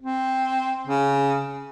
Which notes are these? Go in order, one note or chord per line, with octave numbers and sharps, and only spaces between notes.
C4
C#3